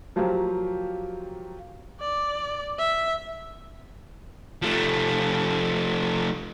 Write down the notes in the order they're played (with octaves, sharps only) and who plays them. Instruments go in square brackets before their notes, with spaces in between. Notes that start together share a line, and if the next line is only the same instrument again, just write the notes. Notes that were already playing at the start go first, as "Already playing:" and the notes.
[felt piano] F3 F#3 A#3 G4 C5 F5
[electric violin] D5
E5
[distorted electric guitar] F3 A3